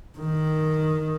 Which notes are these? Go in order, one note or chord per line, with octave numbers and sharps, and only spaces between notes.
D#3